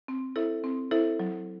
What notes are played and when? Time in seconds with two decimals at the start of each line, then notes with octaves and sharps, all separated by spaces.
0.08 C4
0.36 E4 A4 C5 E5
0.64 C4
0.91 E4 A4 C5 E5
1.19 F#3